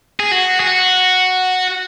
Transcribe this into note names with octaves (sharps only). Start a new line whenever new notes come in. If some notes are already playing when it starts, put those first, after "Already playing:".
G#4
F#4
G#4
F#4